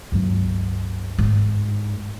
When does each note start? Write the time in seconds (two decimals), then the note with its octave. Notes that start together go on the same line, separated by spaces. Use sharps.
0.12 C#2 G2 F#3
1.19 G#2